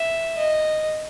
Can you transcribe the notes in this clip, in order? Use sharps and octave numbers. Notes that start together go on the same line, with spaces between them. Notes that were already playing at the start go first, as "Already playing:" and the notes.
Already playing: E5
D#5